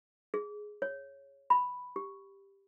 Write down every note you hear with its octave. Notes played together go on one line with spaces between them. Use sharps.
G#4
C#5
B5
G4